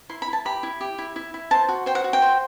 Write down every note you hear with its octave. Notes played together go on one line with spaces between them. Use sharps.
E4 C6
B5
E4 A5
G4 B5
E4
G4
E4
E4
E4
C5 A5
F#4
C5 G5
F#5
F#4
G5
C5